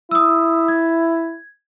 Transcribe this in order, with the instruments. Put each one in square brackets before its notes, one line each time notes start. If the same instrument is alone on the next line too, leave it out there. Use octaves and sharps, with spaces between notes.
[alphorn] E4 [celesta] D#6 E6
[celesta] G#6